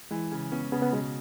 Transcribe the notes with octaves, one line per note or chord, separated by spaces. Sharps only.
E3 G#3
C#3
B3 C#4
C#3 B3
B3
B2 G#3